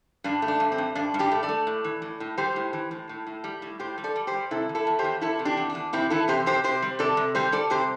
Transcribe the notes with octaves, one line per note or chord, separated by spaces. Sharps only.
G2 D4
A3
D4
G2
C4
G2
G2 D4
G2
D4 G4
A3
A4 D5
A3
A2
E3
A2
A2
G3 G4 C5
A2
E3
A2
A2
A2
G3
A2
A2 G4 C5
G3
A4 D5
G3
G4 C5
G3
C3 E4 A4
E2
E4 A4
E2
G4 C5
E2
E2 E4 A4
C3
D4 G4
E2
D4
E2
C3 C4 E4
E3 E4 A4
C3 G4 C5
C3 G4 C5
C3 G4 C5
G3
C3 A4 D5
C3
G3 G4 C5
G3 A4 D5
C3 G4 C5